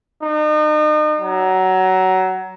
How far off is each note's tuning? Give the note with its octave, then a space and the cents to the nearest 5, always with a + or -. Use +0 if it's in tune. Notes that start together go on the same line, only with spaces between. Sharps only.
D#4 -35
F#3 +20